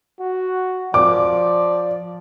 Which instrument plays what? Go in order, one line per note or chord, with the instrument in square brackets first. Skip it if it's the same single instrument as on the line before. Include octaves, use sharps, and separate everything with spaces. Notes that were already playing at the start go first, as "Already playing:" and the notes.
[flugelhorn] F#4
[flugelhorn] F3 [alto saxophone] D5 [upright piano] D6